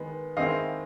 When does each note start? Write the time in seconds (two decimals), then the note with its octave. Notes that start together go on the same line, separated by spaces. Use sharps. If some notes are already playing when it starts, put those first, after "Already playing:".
Already playing: D#3 G#3 B3
0.37 D#3 G#3 C4 E4 D#5 F5